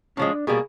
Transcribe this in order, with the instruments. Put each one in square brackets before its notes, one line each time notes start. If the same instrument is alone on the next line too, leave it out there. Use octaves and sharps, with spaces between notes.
[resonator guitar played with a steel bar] A2 F3 G#3 [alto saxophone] C#4
[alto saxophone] D4
[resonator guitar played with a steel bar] B2 G3 A#3 [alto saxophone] G#4